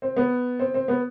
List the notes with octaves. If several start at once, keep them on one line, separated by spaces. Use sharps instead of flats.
C4
B3
C4
C4
B3